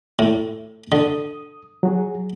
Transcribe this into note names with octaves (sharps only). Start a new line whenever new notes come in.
A2
D3 D#6
F#3 F#4 G#4